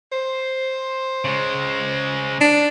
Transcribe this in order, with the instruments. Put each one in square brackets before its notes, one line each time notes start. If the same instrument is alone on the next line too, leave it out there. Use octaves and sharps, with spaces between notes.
[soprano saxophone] C5
[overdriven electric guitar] C#3 G#3
[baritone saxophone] D4